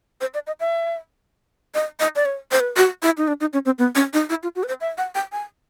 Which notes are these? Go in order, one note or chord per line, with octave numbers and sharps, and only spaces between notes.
C5
D5
D#5
E5
D#5
D#5
D5
C#5
C5
B4
F#4
E4
D#4
D4
D#4
C#4
C4
B3
C#4
D#4
E4
F4
F#4
B4
C5
E5
F#5
G5
G#5